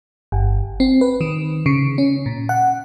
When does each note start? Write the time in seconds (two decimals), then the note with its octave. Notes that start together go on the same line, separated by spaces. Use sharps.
0.32 G1
0.80 C4
1.01 B4
1.21 D#3
1.66 C#3
1.98 C#4
2.26 A#2
2.49 F#5